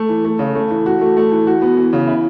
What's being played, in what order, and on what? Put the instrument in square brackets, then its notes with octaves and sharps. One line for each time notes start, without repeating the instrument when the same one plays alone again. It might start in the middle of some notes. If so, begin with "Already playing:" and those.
Already playing: [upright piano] A3
E3
A3
C#3
A3
E3
F#4
A3
A3
E3
F#4
B3
E3
C#3
E4